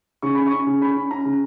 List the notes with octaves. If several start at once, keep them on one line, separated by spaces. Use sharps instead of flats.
C#3 C#6
C#4 B5
C#6
C#4
C#3
C#4 B5
C#4
C#4 A#5
C#3